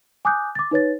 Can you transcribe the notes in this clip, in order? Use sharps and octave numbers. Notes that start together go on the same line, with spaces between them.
G#5 D6 D#6 F#6 G6
D6 A6
D#4 B4 C#5 A6